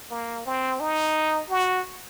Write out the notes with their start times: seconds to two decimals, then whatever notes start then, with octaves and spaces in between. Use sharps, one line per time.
0.10 A#3
0.46 C4
0.80 D#4
1.50 F#4